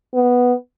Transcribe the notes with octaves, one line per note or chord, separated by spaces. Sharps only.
B3